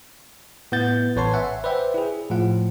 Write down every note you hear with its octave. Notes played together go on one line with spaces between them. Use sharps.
A2 B3 E4 F#5 G6 A6
A1 B4 C#5 A5 C6
E5 F#5 G#5
B4 C5 D5 E5 G5
E4 G#4
A2 F3 F4 F#5